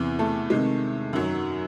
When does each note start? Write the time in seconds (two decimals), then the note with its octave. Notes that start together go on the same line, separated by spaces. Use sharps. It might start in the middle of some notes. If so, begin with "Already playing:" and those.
Already playing: E2 C3 E3
0.19 A3 A4
0.50 C3 D#3 G#3
1.13 F#2 D#3 F#3